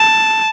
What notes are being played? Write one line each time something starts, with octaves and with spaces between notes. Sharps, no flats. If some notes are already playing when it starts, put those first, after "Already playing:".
Already playing: A5